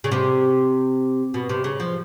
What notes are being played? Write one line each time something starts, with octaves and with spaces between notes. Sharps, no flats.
C#3
C3
B2
C3
C#3
F3